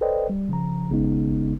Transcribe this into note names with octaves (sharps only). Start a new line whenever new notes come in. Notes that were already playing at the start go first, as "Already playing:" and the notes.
A4 B4 C5 D5 D#5 G5
G3
C#3 F3 A#5
G#1 C#3 G#3 B3 D#4